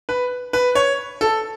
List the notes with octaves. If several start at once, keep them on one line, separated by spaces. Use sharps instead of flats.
B4
B4
C#5
A4